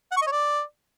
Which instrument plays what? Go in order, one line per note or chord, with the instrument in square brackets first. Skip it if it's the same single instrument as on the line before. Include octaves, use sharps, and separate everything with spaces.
[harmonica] F#5
C#6
D#5
C#5
D5